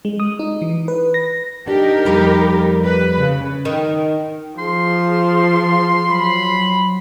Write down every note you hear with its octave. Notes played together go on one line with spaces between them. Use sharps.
G#3
D#6
D#4
E3
B4
A#6
D4 D#4 G4 A#4
F2 G3 A#3
B4
C#3
D#3
F3 G#4 C6
F#3 B5